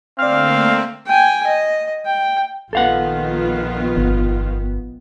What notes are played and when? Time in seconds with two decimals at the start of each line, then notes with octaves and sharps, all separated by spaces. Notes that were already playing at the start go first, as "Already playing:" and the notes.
0.19 D3 A3 A#3 C4 D5 F5 F6
1.06 G5 G#5
1.46 D#5
2.05 G5
2.73 A#1 D#3 B3 F4 A4 F5 F#5
3.97 G1